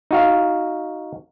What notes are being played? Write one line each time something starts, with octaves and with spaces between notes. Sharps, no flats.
D#4 F#4 F5